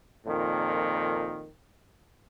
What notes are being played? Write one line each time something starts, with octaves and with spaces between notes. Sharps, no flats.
F2 A#2 D#3